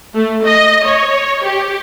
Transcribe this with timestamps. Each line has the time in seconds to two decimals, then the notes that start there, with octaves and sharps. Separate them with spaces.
0.15 A3
0.45 D#5
0.85 C#5
1.45 G4